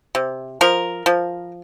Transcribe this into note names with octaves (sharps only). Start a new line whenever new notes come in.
C3
F3 A#4
F3